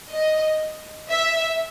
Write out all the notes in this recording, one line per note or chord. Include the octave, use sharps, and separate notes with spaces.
D#5
E5